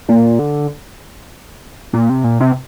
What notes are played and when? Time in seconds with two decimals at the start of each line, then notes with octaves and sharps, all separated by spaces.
0.08 A#2
0.39 D3
1.93 A#2
2.10 C3
2.24 A#2
2.40 C3